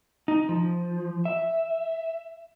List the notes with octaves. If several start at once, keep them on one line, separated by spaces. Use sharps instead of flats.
D#4
F3
E5